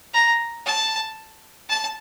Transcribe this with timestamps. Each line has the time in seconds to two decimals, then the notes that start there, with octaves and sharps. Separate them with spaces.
0.14 A#5
0.66 A5
1.70 A5